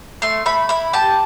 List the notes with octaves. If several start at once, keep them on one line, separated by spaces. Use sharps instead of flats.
A3 C6
A3 B5
E4 B5
G4 A5